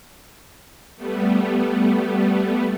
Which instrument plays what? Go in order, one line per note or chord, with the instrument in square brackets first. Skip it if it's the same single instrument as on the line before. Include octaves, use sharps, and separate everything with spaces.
[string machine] G3 A3 B3